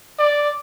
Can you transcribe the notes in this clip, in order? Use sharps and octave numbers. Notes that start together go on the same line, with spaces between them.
D5